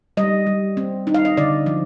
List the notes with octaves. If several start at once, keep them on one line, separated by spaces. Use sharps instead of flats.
G3 D#5
G3
C4
D#4
F5
D#5
D3 D5
F3